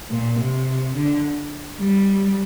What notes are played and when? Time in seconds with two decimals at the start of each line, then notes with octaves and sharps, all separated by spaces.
0.11 A#2
0.38 C3
0.95 D3
1.79 G3